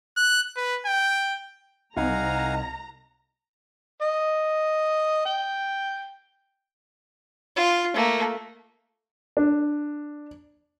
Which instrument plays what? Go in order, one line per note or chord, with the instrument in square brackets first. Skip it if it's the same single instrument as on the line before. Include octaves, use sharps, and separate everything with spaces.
[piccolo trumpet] F#6
B4
G5
[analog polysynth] C2 [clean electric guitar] D#4 [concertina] F5 F#5 G#5 [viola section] A#5
[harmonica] D#5
G5
[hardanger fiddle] F4
A3 A#3
[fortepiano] D4